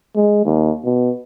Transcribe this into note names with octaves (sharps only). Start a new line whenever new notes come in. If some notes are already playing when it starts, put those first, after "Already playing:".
G#3
D#2
B2